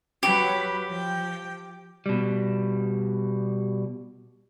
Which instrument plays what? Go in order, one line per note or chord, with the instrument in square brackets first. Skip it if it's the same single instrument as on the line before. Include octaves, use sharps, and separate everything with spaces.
[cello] F#3 B4 [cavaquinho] G4
[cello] F3 G5
[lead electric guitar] B2 G3